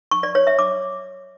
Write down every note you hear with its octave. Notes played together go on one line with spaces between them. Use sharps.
C#6
D5
C#5
E5
D6